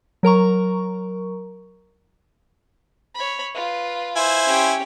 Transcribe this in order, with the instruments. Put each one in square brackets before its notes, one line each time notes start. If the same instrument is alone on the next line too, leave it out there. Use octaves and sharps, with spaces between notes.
[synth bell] F#3 A#4 A#5 C#6
[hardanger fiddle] C#5 B5
F4 B4
[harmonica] E4 C5 G#5
[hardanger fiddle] C#4 G4